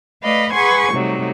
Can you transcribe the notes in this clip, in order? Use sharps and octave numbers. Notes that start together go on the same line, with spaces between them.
A3 B4 D5 D#5 F5 B5
G#4 B4 F#5 G#5 C6 C#6
C3 F#3 G3 A3 D#4